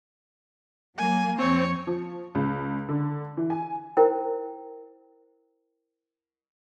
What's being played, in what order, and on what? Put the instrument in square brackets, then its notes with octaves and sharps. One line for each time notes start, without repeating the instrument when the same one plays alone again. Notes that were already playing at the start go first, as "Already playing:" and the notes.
[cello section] F#3 A#3 [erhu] G#5
[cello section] F2 [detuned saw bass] C4 [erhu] C#5
[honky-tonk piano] F3
C#2
D3
E3
G#5
[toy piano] E4 A#4 C5 G5